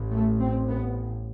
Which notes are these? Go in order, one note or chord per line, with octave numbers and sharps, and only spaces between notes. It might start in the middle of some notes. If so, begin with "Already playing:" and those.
Already playing: A1 A2
A3
C4
B3